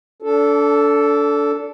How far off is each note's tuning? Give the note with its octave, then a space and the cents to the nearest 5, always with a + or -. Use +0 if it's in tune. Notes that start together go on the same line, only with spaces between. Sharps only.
D4 -30 A4 +0